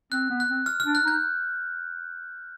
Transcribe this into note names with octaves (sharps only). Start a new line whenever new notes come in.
C4 F#6
B3
F#6
C4
F6
F6
D4
F#6
D#4 G6